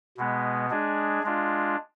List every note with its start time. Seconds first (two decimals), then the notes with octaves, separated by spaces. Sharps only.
0.17 B2 G#3 B3
0.70 G#3 D4 G#4
1.23 G#3 D4 F4